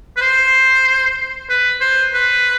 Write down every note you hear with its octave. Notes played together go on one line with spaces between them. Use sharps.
B4
C5
B4
C5
B4